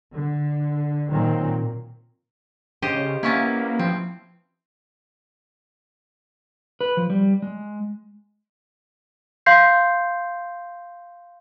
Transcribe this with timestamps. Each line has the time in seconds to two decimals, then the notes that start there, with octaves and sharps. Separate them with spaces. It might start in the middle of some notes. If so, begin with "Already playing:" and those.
0.14 D3
1.10 A#2 D#3 F#3 A#3 C4
2.82 C#3 G4 C5 D#5
3.23 A#3 B3 C#4 E4
3.79 F3 C4
6.81 B4
6.97 F3
7.10 G3
7.42 G#3
9.46 F5 C6 G6 C7